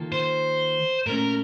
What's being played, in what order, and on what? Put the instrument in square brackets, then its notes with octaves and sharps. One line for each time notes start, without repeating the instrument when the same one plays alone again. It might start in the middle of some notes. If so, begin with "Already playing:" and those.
Already playing: [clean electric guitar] D#3 A#3 F4 A4
[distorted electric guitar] C5
[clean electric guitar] A#2 A3 C#4 [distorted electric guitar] A#4